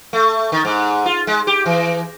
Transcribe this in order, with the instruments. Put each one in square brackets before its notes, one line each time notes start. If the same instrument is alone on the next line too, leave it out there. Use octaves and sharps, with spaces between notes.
[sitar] A3
D#3
G#2
F4
G#3
G4
E3